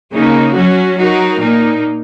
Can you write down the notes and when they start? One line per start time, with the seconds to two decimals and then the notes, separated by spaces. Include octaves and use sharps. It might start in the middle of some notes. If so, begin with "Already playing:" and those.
0.13 C#3 A#3 D#4
0.54 F#3 C#4 F#4
0.97 F#3 D#4 F#4 A#4
1.39 A#2 A#3 D#4